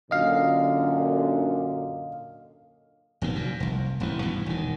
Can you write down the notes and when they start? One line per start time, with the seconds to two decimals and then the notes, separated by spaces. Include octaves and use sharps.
0.11 F#2 A#2 D3 D#5 F5
3.22 F1 B2 D#3
3.35 F#2 A#2
3.60 F1 C2
4.00 E1 A1 D#2 E3
4.22 G2 B2 E3
4.46 E1 D#3